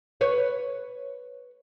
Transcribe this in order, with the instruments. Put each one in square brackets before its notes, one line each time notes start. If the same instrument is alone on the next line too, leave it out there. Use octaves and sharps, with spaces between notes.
[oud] B4 C#5